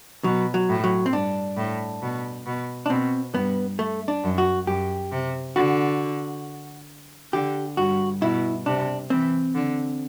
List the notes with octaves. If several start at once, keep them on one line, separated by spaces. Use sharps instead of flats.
B2 F#3
F#3
A2
F#3
C4
G2 D4
A2
B2
B2
D4
B2 C4
G2 B3
A3
D4
F#2
F#4
F#2 G4
C3
D3 F#4
D3 G4
G2 F#4
B2 E4
C3 D4
E3 C4
D3